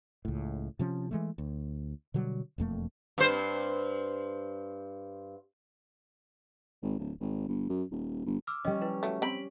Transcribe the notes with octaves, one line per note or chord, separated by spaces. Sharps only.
C#2 A2
C3 F3 C#4
E3 G#3 A3
D2
B2 D3 F#3 G3
E1 F2 A3 A#3
G2 C5
G#1
D1
G#1
G1
F#2
D#1
G1
D6 E6 F6
G3 C#4 D#5
E4 B4
F#3 A3
C4 B5 B6 D7 F#7